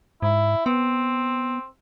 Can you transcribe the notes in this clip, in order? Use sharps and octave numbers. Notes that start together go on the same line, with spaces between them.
G#2 E4
B3 C4